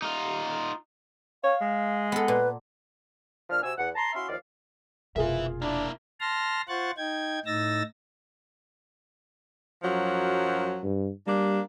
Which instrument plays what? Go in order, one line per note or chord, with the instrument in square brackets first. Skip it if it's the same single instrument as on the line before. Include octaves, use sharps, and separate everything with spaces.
[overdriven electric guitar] D#4 F4
[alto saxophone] C#5 [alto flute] F5
[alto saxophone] G#3
[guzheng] B3 A4
[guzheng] A#2 [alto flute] B4
[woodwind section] A#2 F3 D4 F6
C3 C4 F#4 G#5 E6
E2 F#5
A5 A#5 C6
C#4 E4 F#4 E5 F5 C6
D#2 D#3 F3 D5 F5
[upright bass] F1 B2 [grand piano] F4 G#4 A#4 [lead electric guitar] B4 E5
[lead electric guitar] A#3 E4 [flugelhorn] D4
[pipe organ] A5 C6 F6 A#6
F4 C5 F#5 C#6 F#6 A6
D#4 G5 G#6
A2 D#4 E6 A6 A#6
[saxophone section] F#2 F3 F#3
[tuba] G2
[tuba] G3 [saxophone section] A#3 D4